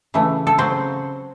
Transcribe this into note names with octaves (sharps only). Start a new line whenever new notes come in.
C#3 E3 A3
A4
C#3 F#3 C4 C5